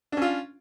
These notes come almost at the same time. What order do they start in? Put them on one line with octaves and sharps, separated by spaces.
D4 C#4 F4